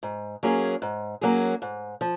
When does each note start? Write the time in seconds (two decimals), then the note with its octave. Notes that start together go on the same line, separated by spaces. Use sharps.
0.03 G#2
0.43 F#3 A#3 C#4 G#4
0.82 G#2
1.21 F#3 A#3 C#4 G#4
1.62 G#2
2.01 F3